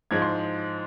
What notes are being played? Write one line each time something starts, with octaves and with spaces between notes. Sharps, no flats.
G#2 F3 G#3 G#6
C6